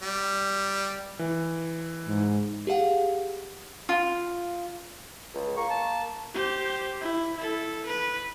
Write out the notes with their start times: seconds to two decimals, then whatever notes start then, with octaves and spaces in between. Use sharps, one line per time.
0.02 G3
1.19 E3
2.07 G#2
2.67 G4 G#4 F5 F#5
3.89 F4
5.34 C#2
5.57 A#3 C#6
5.70 A5
6.34 G4 C5
7.01 E4
7.37 E4 A4
7.86 B4